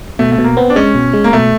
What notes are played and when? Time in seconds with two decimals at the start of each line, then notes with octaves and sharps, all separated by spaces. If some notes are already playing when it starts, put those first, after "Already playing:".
0.19 B2 A3
0.32 A3
0.38 B2
0.44 A#3
0.57 B3 C4
0.70 D4
0.76 G#3 C#4
0.95 B2
1.13 G#3
1.24 A#3
1.33 B2 A3